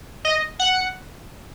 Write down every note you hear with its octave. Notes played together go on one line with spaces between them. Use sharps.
D#5
F#5